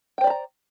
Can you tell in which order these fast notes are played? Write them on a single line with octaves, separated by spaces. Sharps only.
G5 C5 D5 B5 A#5